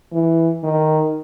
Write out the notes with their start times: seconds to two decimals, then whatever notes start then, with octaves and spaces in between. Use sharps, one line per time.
0.12 E3
0.63 D#3